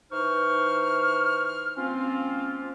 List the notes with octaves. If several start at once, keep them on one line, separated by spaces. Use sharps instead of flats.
E3 D#4 C5 C#6 F6
F3 A#3 C4 C#4 F4